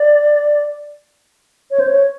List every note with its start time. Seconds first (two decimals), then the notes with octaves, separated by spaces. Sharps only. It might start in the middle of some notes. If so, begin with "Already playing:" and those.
Already playing: D5
1.71 C#5
1.80 C5
1.87 C#5